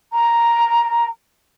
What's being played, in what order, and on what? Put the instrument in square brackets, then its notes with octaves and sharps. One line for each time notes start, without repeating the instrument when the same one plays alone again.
[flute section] A#5